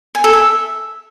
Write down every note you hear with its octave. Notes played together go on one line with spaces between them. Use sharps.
G#5
A4
E5